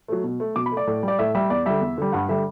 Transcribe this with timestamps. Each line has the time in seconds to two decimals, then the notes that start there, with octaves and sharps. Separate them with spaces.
0.08 F#3 A3
0.24 B2
0.40 A3
0.56 B2 D6
0.66 B5
0.72 A3
0.77 D5
0.87 A2
1.03 G3
1.08 D5
1.19 A2 E5
1.35 G3 E5
1.50 E2 D5
1.66 D3 G3 E5
1.81 E2
1.97 D3 G3
2.13 G2 F#5
2.29 D3 G3 E5